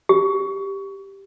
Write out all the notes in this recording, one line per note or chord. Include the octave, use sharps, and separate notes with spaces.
G4